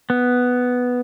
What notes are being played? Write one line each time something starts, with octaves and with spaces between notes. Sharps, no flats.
B3